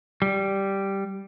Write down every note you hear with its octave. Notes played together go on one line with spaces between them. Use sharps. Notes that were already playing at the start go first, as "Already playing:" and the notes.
G3